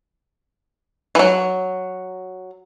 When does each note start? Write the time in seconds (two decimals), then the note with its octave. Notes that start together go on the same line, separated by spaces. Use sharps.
1.15 E3 F#3